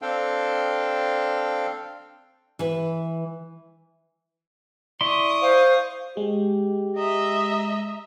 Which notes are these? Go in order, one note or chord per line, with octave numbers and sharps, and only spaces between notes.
C4 D4 A4 F5 G5
E3 B4
E4 D5 C6 C#6 D#6
C5 F5
G#3 G4
D#5 E5 A#5